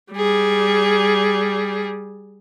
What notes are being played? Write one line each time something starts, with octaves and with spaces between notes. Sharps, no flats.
G3 G#4